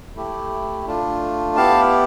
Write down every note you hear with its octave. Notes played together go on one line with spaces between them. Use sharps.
A3 E4 G4
A3 D4 F4
B3 E4 G4 F5 A5